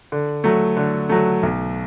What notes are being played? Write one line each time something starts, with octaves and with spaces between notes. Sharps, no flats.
D3
F#3 A3
D3
F#3 A3
B1